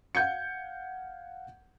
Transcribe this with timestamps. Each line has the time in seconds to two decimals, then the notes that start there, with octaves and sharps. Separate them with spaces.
0.15 F5 F#5 G6 G#6 C#7